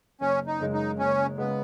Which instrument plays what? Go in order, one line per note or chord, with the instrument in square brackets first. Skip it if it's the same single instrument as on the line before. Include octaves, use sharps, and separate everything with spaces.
[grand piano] F#1 [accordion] C#4
[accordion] D#4
[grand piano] F#2 C#3 G#3
[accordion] D#4
[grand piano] F#1 [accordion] C#4
[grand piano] C#3 G#3 [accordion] B3